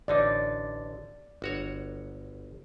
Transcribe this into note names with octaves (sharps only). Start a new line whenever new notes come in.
A1 D3 D#4 D5
G1 F#4 C#5